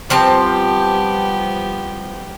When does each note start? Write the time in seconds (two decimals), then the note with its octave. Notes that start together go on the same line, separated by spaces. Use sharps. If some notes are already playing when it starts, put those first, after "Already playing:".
0.10 F3 G3 B3 C4 G4 A5